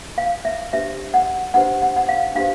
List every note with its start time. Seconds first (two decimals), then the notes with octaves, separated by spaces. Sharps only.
0.18 F5
0.45 E5
0.73 D4 G4 C5 E5
1.14 F#5
1.54 D4 G4 C5 F#5
1.82 F#5
1.96 F#5
2.09 F5
2.35 D4 G4 C5 F5